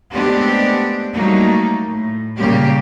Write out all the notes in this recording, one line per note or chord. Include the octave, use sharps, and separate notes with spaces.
G#3 A3 B3 C4 D4 G4
F#3 G3 A3 A#3 D#4
A2
A#2 C#3 G3 A#3 G4